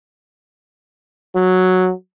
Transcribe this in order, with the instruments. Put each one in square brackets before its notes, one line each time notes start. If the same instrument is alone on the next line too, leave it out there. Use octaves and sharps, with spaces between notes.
[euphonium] F#3